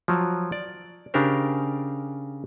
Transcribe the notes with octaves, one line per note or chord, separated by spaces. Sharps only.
F3 F#3
D5
C#3 D4 G4 A#4 C5